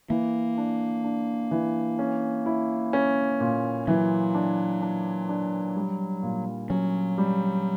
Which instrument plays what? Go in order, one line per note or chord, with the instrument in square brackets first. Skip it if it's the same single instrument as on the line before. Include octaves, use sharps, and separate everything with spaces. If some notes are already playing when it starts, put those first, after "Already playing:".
[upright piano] E3 [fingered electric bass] A#3
[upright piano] D4
D4
E3
C#4
E4
C#4
A#2
[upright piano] E3 [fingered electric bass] F#3
[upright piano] D4
D4
D4
G3
A#2
[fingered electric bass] F#3 [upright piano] C#4
[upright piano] G3